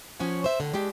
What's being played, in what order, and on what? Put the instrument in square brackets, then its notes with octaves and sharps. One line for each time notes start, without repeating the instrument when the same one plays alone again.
[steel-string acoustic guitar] F3 C#4 C#5 F#5 G#5
C5 E5
A2 D3
G#3 D4 G4